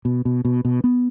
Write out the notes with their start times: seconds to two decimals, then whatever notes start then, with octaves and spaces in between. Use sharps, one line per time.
0.05 B2
0.25 B2
0.45 B2
0.65 B2
0.84 B3